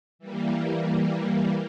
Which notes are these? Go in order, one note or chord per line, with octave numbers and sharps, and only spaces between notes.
E3 G3 A#3